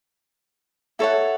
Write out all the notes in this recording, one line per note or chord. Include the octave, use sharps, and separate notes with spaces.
E4 A4 C#5 F#5